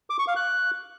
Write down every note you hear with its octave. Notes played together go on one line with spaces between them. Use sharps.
D6
C#6
F5
F#6